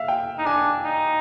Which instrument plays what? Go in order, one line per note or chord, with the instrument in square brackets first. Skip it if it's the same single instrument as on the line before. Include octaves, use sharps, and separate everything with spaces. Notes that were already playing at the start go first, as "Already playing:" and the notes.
Already playing: [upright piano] E5 F5
G5
[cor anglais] D#4
[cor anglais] D4 [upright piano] G#5
[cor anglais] D#4